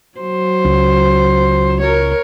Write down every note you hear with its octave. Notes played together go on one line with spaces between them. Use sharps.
F#3 C5
C#2
A#4 C#5